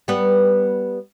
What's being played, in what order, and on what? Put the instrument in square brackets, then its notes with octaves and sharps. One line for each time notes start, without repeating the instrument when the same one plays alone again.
[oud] G3 B3 B4